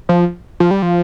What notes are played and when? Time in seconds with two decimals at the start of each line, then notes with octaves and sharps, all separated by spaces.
0.09 F3
0.60 F3
0.71 G3
0.82 F3